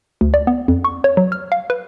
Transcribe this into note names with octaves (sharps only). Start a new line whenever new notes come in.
D2
D5
B3
F2
C#6
C#5
F#3
F6
F5
B4